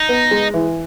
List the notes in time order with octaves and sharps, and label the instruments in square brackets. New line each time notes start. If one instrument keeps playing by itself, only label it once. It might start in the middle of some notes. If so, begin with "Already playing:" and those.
Already playing: [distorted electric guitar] D#4
[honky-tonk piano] B3
G#3
E3